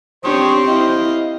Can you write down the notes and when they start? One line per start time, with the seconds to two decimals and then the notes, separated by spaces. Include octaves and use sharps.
0.24 C4 D4 G4 C5 C#5 D#6
0.68 E4 D#5 F5